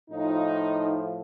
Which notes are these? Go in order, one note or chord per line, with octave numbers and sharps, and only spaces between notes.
A2 F3 D#4